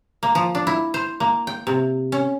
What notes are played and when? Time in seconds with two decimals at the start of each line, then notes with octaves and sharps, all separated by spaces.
0.23 A#3
0.35 F3
0.55 D4
0.67 E4
0.94 C5
1.20 A#3
1.47 G5
1.67 C3
2.12 C#4